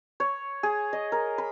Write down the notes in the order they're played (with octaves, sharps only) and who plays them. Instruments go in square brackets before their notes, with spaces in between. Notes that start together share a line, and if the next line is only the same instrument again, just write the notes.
[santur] C#5
G#4
D#5
A#4
B5